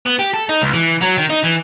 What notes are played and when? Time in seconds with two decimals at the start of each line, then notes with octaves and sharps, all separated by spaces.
0.06 B3
0.19 G4
0.34 A4
0.49 D#4
0.62 C#2
0.73 E3
1.01 F#3
1.18 D#3
1.30 D#4
1.44 E3